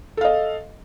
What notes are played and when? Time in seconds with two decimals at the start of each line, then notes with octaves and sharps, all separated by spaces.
0.17 A4
0.21 F5
0.25 D#5